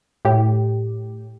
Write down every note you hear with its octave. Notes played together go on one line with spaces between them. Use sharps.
A2 G4